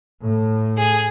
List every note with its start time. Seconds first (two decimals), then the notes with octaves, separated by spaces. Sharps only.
0.22 A2
0.77 G#4